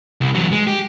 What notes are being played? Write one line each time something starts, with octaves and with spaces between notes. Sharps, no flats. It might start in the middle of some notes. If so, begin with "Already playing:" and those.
C2
E2 F#3
G#3
G4